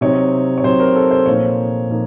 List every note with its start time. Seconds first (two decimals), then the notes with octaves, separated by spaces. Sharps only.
0.01 C3 F#3 C4 D#4 C#5
0.58 C#5
0.63 C3 F#3 C4 D#4 C5
0.80 A#4
0.96 A4
1.11 C5
1.26 A#2 F3 A#3 D#4 C#5
1.89 A#2 F3 A#3 D#4